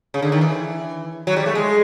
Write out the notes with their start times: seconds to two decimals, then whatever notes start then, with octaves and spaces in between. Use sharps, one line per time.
0.14 C#3
0.22 D3
0.32 D#3
0.41 E3
1.27 F#3
1.36 G3
1.46 A3
1.55 G#3